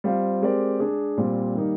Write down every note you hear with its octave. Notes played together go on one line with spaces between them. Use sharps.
G3 C4 F4 C5 F5
G#3 C4 G4 A#4 D5
G#3 D4 G#4
A#2 G3 C4
D#3 G3 A#3 D#4